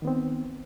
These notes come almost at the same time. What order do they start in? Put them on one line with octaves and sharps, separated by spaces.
D#3 B3 C4